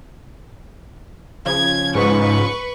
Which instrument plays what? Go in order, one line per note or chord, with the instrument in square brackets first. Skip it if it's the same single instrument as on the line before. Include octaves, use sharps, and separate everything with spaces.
[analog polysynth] C#3 F3 [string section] G#6
[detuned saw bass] G#2 [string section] B4 C#6